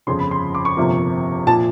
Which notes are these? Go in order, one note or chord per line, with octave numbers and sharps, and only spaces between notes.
G1 F2 C#3 F3 C6
B5
C6
D6
C#6
G1 F2 C3 F3 A#3
A#2 F3 A5